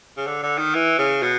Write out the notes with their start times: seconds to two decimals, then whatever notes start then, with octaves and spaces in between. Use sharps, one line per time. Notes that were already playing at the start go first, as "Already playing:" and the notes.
0.17 C#3
0.26 D3
0.42 D3
0.58 D#3
0.74 E3
0.98 C#3
1.22 B2